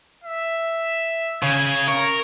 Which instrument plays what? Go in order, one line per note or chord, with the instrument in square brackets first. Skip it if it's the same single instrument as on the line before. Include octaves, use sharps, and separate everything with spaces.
[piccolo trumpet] E5
[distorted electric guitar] C#3 [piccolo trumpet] G#6
[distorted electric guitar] A#4 [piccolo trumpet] C#6